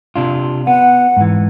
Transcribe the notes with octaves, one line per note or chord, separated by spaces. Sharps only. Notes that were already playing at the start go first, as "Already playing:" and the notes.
C3 D4 F4
B3 F#5
G#2 E3